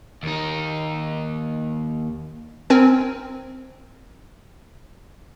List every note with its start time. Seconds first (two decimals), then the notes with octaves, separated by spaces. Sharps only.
0.23 D#2 D#4
2.70 C4 A#4 G#5